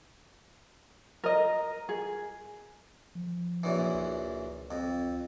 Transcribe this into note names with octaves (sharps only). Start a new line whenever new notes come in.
A#4 D#5
G#4
F3
A#1 F#2 E3
C#2
F2